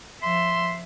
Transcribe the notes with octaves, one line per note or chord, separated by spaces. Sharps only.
F3 E5 C6